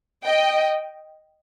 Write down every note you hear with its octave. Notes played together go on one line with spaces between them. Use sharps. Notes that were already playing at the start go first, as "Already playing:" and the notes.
D#5 G5